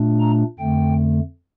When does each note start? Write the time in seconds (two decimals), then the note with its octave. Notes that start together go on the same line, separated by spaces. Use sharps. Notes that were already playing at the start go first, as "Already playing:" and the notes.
Already playing: A#2 A3 D4
0.20 A#5
0.59 F2 D3 A3 G5